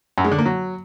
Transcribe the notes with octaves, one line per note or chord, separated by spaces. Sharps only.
F#2
G#3
D3
A#3
F#3